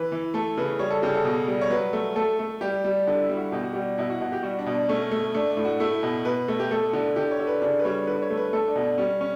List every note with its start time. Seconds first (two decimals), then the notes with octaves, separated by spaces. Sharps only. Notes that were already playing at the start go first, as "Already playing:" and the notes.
Already playing: E3 B4
0.12 E3
0.34 A3 A4
0.57 C#3 B4
0.79 G3 C#5
0.90 A4
1.02 C#3 G4
1.14 A4
1.25 B2
1.48 G3
1.61 C#5
1.70 F#3 B4
1.93 A3
2.16 A3 A4
2.39 A3
2.61 G3 G4
2.84 G3
3.07 D3 D4
3.22 E4
3.29 G3
3.37 F#4
3.52 B2 G4
3.63 F#4
3.73 G3 G4
3.98 B2 E4
4.10 F#4
4.20 B2 F#4
4.32 G4
4.43 G3 F#4
4.59 D4
4.66 B2
4.74 D4
4.89 A3 C#4
5.11 A3
5.34 A3 D4
5.50 D4
5.57 A2
5.65 F#4
5.80 A3 E4
6.03 B2
6.25 B2 B4
6.48 A3
6.60 G4
6.71 A3 A4
6.93 D3
7.16 D3 G4
7.31 C#5
7.39 D3
7.47 B4
7.62 C#3 D4
7.79 B4
7.85 G3 C#5
8.07 D3 B4
8.22 C#5
8.30 A3
8.37 B4
8.53 A3 A4
8.68 D4
8.76 B2
8.84 D4
8.98 G3 C#4
9.21 C#4